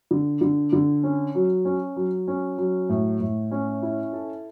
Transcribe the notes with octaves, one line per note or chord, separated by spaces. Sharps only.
D3
D3
D3
C#4
F#3
C#4
F#3
C#4
F#3
A2
A2
C#4
E4
A4